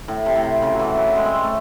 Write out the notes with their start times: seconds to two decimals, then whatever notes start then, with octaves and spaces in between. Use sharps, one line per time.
0.08 A2
0.26 C3
0.36 A2
0.44 C3
0.62 C#3
0.74 F#3
0.79 E3
0.97 F#3
1.16 G#3
1.25 C4
1.33 A3
1.43 A3